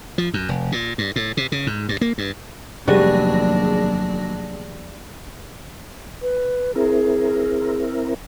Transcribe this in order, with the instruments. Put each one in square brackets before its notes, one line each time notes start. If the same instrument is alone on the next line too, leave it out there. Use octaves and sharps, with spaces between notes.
[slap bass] F3
F#2
F1
A#2
G2
A2
C3
C#3
G#2
G2
A#3
G2
[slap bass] F1 [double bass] D#2 D4 [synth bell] F#3 G#4 A#6 [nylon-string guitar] G3
[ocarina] B4
[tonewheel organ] C4 E4 A#4 [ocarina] G#4